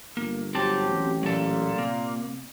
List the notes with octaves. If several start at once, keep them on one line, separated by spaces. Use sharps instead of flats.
G1 A#3
F#3 C4 G4 A5
A1
A#2 F#3 A4
C3 A#3